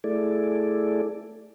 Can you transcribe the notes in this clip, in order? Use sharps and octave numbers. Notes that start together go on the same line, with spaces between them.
A3 E4 G#4 A4 D5